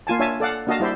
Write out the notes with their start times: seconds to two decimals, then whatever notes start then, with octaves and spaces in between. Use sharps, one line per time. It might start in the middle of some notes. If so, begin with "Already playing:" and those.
0.07 A#3 F4 G#5 A5
0.19 D4 C#5 E5 G#5 A5
0.40 A4 D5 F5 F#5
0.67 A#3 D4 F#4 D#5 F5 A5
0.80 G3 E4 C5 D5 E5